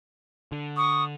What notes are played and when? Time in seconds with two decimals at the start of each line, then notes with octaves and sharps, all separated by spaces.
0.52 D3
0.77 C#6 D#6